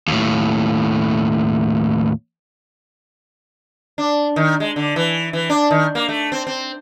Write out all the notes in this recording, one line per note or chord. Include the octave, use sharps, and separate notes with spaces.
D#2 A2
D4
D#3
G#3
D3
E3
E3
D4
D#3
A#3
A3
C4
C4